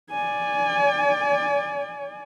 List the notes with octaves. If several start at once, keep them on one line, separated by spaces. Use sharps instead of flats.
D5 G#5